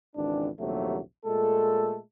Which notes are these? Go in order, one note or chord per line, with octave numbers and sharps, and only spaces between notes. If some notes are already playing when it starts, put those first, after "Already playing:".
G#1 C#2 E3 D4
A#1 D#2 C3 F#3 A3
A#2 G#3 A3 A4